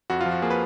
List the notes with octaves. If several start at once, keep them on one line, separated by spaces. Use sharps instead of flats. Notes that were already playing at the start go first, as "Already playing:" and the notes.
F2 F#4
F4
F3
F#4
A#3 G#4
B4